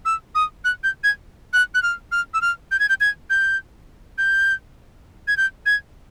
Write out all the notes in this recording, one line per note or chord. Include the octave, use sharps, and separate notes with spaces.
E6
D#6
F#6
G6
G#6
F#6
F#6
F6
F6
E6
F6
G6
G#6
G6
G#6
G6
G6
G#6
G6
G#6